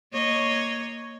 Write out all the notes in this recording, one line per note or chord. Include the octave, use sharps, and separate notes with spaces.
A#3 C#5 D#5